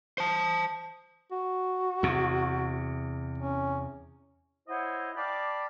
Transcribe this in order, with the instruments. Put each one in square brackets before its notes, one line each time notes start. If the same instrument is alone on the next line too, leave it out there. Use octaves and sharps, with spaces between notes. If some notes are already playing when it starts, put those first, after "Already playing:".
[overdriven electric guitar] C5 A5
[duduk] F#4
[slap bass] E2 C3
[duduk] C#4
[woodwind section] E4 C5 C#5 D#5 E5 F#5
D5 F5 G5 A5 B5 D6